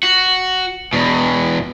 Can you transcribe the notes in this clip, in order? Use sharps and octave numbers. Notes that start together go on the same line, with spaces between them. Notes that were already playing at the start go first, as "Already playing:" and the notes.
F#4
E2 B2